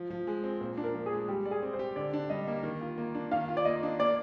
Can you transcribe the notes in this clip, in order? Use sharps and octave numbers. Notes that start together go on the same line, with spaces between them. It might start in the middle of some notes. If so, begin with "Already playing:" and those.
Already playing: F3
F3
G#3
C4
A#2 C5
D4
A#4
F3
G#4
G#3
G3 G4
D5
G#4
C4
C5
G4
D3 D5
D4
G3 D#5
A#3
D#3
F4
A#3
D4
D#3 F5
F4
D5
A#3 D#5
D4
A#3 D5